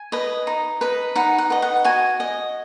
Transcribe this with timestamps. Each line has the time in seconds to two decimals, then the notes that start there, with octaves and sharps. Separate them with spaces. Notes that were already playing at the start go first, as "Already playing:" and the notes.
Already playing: G#5
0.12 B4 D#5
0.47 D#4
0.81 B4 D#5
1.15 D#4 F#5
1.38 F#5
1.50 B4 D#5
1.62 F#5
1.84 F#4 G#5
2.20 D#5